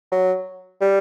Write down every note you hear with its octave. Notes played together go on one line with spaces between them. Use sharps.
F#3
G3